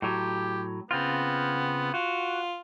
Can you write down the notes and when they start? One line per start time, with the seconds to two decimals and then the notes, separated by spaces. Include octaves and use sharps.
0.02 A2 F#3 G4
0.91 C#3 B3 C4 F4
1.94 F4 F#4